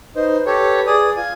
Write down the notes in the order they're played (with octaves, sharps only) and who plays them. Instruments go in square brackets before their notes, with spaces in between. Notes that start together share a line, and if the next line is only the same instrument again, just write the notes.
[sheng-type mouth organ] D#4 C5 [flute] B4
[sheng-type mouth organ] G4 A4 C#5
G#4 D5 D#6
F4 G#5